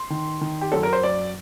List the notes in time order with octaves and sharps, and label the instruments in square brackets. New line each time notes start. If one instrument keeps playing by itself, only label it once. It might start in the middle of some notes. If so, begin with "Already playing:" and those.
Already playing: [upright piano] C6
D#3
D#3
G4
F#2 A4
A#4
C5
F#2 D5